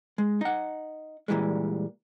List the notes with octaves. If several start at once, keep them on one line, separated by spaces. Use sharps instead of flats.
G#3
D#4 F#5
A#2 C#3 E3 G3 G#3